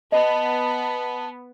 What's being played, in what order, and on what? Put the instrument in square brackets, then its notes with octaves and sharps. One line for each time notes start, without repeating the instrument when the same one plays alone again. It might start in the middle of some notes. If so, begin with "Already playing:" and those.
[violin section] B3 [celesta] D#5 [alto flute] A5